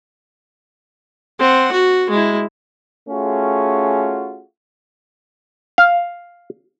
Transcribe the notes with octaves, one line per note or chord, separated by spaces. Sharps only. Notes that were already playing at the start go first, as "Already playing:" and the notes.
C4 F#5
F#4
G#3 E4
A3 C#4 F4 F#4 G#4
F5